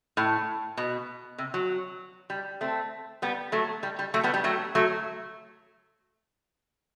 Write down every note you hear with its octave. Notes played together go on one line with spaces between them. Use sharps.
A2
B2
C3
F#3
G3
A3 C4
G3 B3
F#3 A3
G3
G3
F#3 A3
G3 B3
G3
F#3 A3
F#3 A3